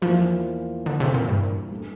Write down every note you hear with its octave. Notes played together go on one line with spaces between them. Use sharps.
E2 E3 F3 A#3 F4 C5
D3
C3
A#2
G2
G3 D4 A4